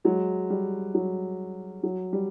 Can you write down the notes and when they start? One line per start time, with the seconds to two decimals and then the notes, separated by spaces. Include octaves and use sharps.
0.04 F#3 G#3
0.50 G3
0.95 F#3
1.83 F#3
2.13 G3